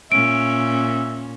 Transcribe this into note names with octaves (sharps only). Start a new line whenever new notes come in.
A#2 C#4 E5 D7